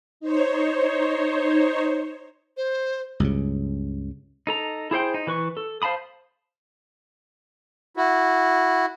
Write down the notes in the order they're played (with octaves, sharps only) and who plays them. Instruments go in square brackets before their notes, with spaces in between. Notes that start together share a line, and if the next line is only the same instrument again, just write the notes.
[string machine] D#4 C5 C#5
[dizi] C5
[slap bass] C#2 G2 C#3
[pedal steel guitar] D#4 A4 A#5
E4 G#4 C5 G5
D#4
E3 B4 C#6
A4
C5 F5 A5 B5 D#6
[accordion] E4 F#4